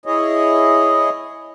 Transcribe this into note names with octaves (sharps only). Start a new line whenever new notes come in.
E4 G#4 C#5 D#5